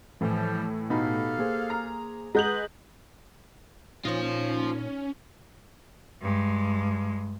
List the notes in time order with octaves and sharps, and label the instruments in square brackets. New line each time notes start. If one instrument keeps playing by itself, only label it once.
[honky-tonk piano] A2 E3 [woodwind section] F3 G3
[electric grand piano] B2 D#4 B5 [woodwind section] G4 A4 F5
[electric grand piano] A#3 G#4 C5
[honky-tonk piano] A#5
[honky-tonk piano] G#3 G6 F#7 [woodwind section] B4 D#5 [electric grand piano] F#5 A#5
[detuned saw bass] A#2 [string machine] C#4 [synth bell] D#4 C#5 [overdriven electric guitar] F4 C5
[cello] G2 G#3